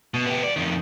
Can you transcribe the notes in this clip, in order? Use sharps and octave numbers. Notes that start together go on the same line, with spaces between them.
B2
B3 G4
F2 D5
F2 D#3